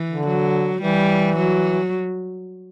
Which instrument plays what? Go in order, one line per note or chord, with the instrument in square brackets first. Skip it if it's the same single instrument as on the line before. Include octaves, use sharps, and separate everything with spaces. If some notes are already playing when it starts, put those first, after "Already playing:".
Already playing: [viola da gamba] E3
[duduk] D3
[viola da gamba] F#3
[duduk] E3 [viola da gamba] G3
[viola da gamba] F#3